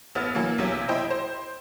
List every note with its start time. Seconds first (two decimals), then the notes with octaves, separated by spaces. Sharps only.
0.15 A1 B3 F6 A6
0.35 E3 F#3 A#3
0.58 B1 C3 F#3 G#6
0.88 E4 C5 D#5 G5
1.10 C5